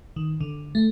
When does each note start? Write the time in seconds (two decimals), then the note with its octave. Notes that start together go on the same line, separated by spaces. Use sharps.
0.16 D#3
0.41 D3
0.75 A3